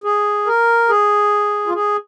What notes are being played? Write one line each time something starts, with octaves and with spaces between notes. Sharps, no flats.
G#4
A#4
G#4
F4
G#4